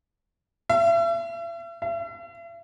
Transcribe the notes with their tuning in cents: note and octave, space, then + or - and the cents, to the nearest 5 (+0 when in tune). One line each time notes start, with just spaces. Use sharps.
E5 +40
E5 +45